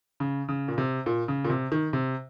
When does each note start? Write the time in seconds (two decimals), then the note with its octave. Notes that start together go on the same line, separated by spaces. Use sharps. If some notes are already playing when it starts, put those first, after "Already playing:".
0.20 C#3
0.49 C#3
0.68 A#2
0.78 C3
1.06 A#2
1.28 C#3
1.45 A#2
1.50 C3
1.72 D#3
1.93 C3